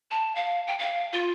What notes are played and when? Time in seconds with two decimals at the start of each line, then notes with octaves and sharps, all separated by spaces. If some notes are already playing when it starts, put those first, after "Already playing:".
0.11 A5
0.35 F5
0.67 G5
0.79 F5
1.13 F4